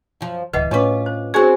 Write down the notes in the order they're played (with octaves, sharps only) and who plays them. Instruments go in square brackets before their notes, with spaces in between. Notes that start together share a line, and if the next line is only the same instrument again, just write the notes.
[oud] F#2 F3
[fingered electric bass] D1 C#2 [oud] E3 [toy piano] B4 D#5 F#5
[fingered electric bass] A2 [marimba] C#4 C#5 [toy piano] D4 D6 [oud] F4 B4
[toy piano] C5
[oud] C4 C#5 [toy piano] D4 C5 G#5 [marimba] F#4 G#4 C#6